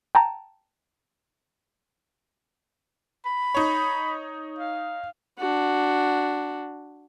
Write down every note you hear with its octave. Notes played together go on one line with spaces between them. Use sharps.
G5 A5 A#5
B5
D#4 C#5
F5
D4 F#4